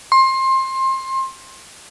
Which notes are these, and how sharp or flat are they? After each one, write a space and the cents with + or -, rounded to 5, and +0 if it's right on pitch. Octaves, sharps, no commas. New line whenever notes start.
C6 +25